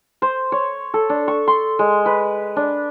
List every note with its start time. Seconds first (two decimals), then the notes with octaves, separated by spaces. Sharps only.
0.22 C5
0.52 C#5
0.94 A4
1.10 D4
1.28 C#6
1.47 C6
1.79 G#3
2.06 B4
2.56 D4